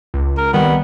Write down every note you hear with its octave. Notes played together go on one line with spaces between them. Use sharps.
C#2
A#4
C2 D#3 G3 B3